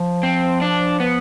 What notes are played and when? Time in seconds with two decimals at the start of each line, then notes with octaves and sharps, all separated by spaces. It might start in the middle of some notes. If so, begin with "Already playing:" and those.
Already playing: F3
0.23 C4
0.61 D4
1.00 B3